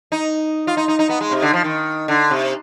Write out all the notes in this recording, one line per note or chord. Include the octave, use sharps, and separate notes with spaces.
D#4
F4
D#4
D#4
D#4
B3
G#3
C3
D3
F3
D#3
D3
C3